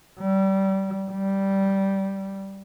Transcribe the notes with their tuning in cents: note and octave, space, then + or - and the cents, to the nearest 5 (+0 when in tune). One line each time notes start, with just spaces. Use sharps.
G3 -25
G3 -10